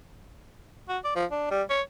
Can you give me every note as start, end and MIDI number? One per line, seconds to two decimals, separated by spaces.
0.89 0.98 66
1.04 1.13 74
1.16 1.25 53
1.31 1.47 62
1.50 1.62 55
1.70 1.81 73